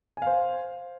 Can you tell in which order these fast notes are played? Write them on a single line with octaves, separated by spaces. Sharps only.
G#5 F5 C5